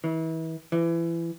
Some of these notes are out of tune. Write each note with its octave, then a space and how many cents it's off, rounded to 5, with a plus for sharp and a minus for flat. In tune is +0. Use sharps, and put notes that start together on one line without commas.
E3 -35
E3 +25